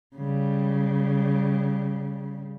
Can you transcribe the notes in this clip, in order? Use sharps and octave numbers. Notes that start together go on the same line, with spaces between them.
C#3 G3